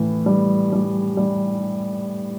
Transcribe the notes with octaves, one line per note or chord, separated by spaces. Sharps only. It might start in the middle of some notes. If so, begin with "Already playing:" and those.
Already playing: A2 E3
G3
G3
G3